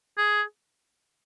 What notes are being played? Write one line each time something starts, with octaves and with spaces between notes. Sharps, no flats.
G#4